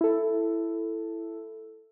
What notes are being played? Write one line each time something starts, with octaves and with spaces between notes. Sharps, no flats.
E4 A4